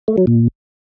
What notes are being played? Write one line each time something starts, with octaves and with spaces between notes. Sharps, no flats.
A3
F#3
A#2